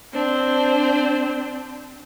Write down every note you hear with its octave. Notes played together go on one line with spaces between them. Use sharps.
C4 D4 C5